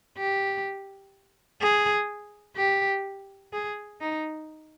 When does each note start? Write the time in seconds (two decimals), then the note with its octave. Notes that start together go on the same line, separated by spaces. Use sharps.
0.18 G4
1.61 G#4
2.57 G4
3.53 G#4
4.00 D#4